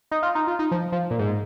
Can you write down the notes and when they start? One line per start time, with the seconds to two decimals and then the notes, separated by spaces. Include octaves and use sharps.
0.11 D#4
0.23 F4
0.35 D#4
0.47 F4
0.59 D#4
0.71 F3
0.92 F3
1.11 A#2
1.19 G#2